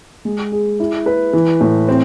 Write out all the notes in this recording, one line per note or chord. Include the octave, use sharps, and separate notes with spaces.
G#3
G#4
E4
B4
E3
A2
C4